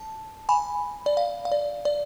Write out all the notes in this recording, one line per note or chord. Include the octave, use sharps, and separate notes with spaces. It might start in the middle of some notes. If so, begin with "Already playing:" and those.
Already playing: A5
G#5 B5
D5
F5
F5
D5
D5